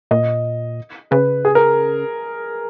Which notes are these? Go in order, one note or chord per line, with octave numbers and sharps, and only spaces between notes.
A#2 D#5
C#3 B4
G#4
A#4